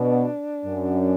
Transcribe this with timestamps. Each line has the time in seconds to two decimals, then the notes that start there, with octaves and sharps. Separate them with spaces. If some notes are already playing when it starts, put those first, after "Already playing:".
Already playing: B2 D4
0.66 F#2